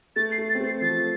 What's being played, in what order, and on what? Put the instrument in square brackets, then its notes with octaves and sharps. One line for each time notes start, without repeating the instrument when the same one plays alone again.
[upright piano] A3 [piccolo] A6
[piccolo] C7
[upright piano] A3
[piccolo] A6
[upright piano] C4
A3
[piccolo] C7
[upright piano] F3 [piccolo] A6